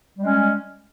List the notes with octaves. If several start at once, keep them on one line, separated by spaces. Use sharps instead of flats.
G3 G#3 C#4